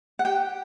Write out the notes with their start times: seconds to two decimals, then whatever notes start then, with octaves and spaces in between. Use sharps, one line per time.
0.19 F#5
0.25 G4 G5